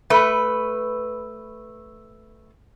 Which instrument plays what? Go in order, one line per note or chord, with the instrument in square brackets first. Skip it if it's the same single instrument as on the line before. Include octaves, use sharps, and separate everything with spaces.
[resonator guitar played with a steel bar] A3 B4